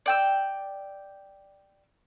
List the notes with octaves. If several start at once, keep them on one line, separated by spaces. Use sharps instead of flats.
D5 G5 E6